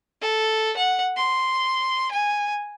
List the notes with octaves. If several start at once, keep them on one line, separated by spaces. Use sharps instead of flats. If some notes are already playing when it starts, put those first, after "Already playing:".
A4
F#5
C6
G#5